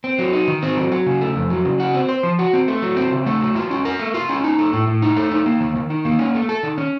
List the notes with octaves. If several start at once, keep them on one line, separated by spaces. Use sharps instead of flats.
C4
F#3
D#4
D#3
C4
F#3
F#3
C#3
A3
F2
F#3
C#3
F#4
C4
C5
F3
F#4
C4
A3
F#3
C4
C#3
A3
F#3
F4
C#4
A#4
A3
F4
C#4
D#4
A3
A2
A2
D#4
A3
D#4
A#3
D#3
D#3
D#4
A#3
C#4
A3
A4
D#3
C#4